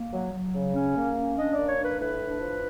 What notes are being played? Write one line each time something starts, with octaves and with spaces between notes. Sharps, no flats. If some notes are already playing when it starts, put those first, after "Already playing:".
Already playing: A#3
F#3
F#3
C#3
C#4
A#3
C#4
D4 D#5
A#3 D5
C#5
D4 B4
A2 B4
D4
F3